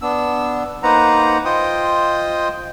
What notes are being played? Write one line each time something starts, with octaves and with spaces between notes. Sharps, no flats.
B3 D4 E6
A#3 D#4 B4 C5 F#5 A#5
F4 C5 D#5 G5 D#6